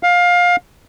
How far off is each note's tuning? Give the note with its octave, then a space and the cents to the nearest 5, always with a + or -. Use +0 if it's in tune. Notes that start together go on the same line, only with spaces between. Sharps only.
F5 +20